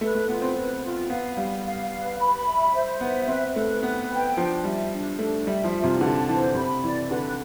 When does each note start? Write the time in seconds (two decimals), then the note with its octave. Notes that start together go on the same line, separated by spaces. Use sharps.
0.01 A3 B4
0.15 A3
0.28 B3 F4
0.42 C4
0.55 B4
0.83 F4
1.10 B3 F5
1.37 G3 F5
1.65 F5
1.92 B4
2.19 B5
2.46 E5
2.74 C5
3.00 B3 E5
3.28 C4 B4
3.56 A3 B4
3.82 B3 B4
4.11 G5
4.37 F3 D4
4.64 G3 E5
4.92 D4
5.19 A3 D4
5.47 G3 E5
5.64 F3
5.74 F4
5.84 C3
5.96 E3
6.01 D3 A5
6.28 E3 C5
6.55 C3 B5
6.83 E3 D5
7.10 D3 B4